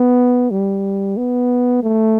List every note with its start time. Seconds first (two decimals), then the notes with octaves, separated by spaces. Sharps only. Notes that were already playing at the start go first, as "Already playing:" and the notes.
Already playing: B3
0.51 G3
1.17 B3
1.83 A3